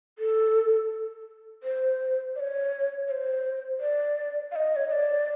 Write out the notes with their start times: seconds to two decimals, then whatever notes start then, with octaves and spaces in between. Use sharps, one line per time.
0.19 A4
1.63 C5
2.36 D5
2.40 C#5
3.07 C#5
3.11 C5
3.80 D5
4.52 F5
4.56 D#5
4.76 C#5
4.88 D#5
4.92 D5